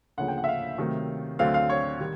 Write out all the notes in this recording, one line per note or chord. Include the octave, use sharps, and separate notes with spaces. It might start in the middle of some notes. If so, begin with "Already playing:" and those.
D2 C#3 F3 A#3 F#5
G5
F#5
E5
F5
C3 D#3 F#3 A3 C4
D2 D3 F#3 A3 C4 F5
F5
C#5
D#3 G3